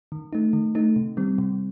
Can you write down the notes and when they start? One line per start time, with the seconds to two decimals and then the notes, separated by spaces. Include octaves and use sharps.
0.12 D#3
0.33 A3 D#4
0.53 D#3
0.75 A3 D#4
0.96 C3
1.17 D#3 G3 C4
1.38 C3